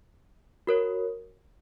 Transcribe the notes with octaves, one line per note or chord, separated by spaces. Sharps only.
F#4 A#4 C#5